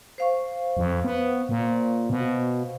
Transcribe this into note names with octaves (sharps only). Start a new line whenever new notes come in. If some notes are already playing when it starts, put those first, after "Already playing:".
C5 F5 C#6
F2
B3
A#2
B2